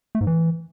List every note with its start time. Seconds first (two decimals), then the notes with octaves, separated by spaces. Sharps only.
0.15 A3
0.21 G#2
0.27 E3